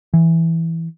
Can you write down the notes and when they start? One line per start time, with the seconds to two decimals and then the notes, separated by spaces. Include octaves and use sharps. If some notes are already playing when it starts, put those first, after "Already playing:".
0.14 E3